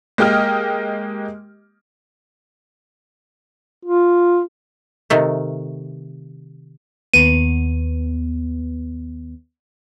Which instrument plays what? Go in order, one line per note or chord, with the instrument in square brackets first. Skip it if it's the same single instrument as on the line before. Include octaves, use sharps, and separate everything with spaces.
[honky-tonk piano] G#3 A#3 G4 D#5 F6
[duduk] F4
[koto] C3 D#3 A3
[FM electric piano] D#2 B3 [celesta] D#7